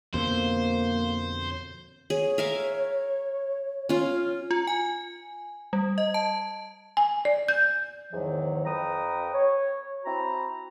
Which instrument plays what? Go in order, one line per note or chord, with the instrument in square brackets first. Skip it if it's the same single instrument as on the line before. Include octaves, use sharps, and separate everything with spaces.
[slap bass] F2 B2 D3 [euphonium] A#3 [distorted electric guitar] C5
[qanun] G#4 [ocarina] C#5
[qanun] A#4 E5 F5
C#4 F4
[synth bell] F4
G#5
G3
D#5
A5
[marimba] G#5
D5
G6
[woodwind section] E2 G#2 D#3 F3 F#3
F2 B4 G5 A#5 D#6
C#5
C4 E4 F#4 A#5